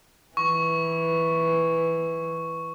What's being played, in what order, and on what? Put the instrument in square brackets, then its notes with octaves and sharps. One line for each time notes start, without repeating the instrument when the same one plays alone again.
[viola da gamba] E3 [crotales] C#6